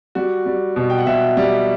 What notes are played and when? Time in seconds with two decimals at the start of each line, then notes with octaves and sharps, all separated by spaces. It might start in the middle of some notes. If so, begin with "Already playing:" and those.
0.15 G3 F#4
0.46 G3
0.76 B2
0.90 G5
0.98 F#5
1.06 B2 E5
1.37 G3